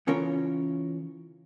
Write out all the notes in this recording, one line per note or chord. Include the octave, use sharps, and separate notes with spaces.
C#3 E3 C#4 F4 A#4 C#5